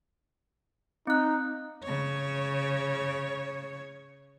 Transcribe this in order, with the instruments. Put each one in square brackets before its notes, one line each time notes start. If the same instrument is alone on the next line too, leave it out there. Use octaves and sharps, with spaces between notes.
[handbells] C4 F#6 [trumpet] D#4
[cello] C#3 C#5